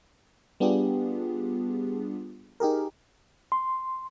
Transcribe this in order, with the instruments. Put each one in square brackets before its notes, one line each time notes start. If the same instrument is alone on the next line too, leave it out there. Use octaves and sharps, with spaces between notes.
[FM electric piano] G3 B3 D4 F4 G4 G#4
D#4 G4 G#4 A#4
[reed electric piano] C6